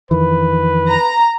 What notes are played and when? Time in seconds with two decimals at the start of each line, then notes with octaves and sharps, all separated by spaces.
0.11 F2 D#3 E3 B4
0.89 A#5